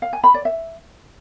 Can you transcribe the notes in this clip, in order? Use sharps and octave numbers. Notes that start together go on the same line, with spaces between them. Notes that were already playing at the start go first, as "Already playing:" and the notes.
F5
G#5
B5
D5
E5